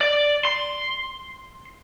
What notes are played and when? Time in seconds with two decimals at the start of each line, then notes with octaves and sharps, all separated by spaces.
0.01 D5
0.45 C6